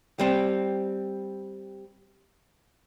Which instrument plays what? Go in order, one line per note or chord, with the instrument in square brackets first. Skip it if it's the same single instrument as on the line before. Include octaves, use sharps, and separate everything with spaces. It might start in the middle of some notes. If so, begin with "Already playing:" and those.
[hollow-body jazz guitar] G3 C4